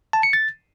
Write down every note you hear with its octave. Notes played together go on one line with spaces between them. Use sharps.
A5
C#7
A6